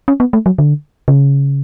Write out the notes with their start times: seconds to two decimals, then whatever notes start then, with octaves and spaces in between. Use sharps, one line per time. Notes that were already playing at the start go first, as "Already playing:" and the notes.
0.08 C#4
0.20 B3
0.33 A3
0.46 F#3
0.58 D3
1.08 C#3